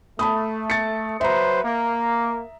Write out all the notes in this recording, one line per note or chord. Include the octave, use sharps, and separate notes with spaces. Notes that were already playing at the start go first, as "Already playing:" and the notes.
A3 A5 B5 D#6
A6 C#7
F#3 B4 C5 E5 A#5
A#3